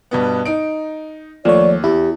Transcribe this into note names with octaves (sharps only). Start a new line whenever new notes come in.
G2 B2 B3
D#4 D7
D#2 F3 A3 C#5 D5
E2 E4 G4